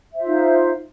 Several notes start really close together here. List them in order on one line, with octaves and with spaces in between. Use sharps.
E5 C5 F4 D#4